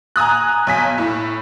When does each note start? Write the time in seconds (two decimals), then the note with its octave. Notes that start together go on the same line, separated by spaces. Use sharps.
0.16 G#5 A#5 D#6 F#6
0.67 B1 G#5 B6
0.98 A2